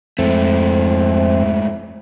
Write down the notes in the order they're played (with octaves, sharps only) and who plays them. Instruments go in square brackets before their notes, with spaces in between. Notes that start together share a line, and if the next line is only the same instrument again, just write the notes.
[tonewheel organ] F2 C4 [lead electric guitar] G#2 A3